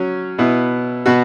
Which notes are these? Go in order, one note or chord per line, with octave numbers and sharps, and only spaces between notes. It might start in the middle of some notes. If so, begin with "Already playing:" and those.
Already playing: F#3 C#4
B2 B3 E4
B2 B3 F#4